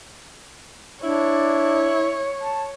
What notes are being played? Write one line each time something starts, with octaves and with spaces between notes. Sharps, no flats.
D4 E4 C#5
A5